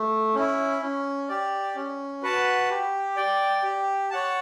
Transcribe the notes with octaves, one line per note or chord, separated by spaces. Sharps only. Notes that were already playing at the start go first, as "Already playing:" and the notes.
Already playing: A3
C#4 E4
C#4
G4 D5
C#4
F#4 B4 F#5 A5
G4
D5 G5
G4
C#5 F#5 A5